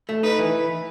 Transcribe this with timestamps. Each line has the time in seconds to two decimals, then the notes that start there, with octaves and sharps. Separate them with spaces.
0.09 A3
0.23 D#4 B4
0.38 E3